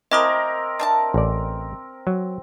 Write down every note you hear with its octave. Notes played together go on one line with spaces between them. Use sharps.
C4 E4 A#4 D#5 A#5 D6 D#6
D4 E5 A5
A1 D5
F#3